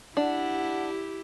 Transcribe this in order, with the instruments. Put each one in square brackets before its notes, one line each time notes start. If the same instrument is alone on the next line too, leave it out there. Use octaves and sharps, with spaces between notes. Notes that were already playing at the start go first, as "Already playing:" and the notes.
[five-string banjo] D4 [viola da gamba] E4 G4 [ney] F#5